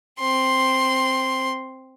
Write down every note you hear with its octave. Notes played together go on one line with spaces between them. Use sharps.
C4 C6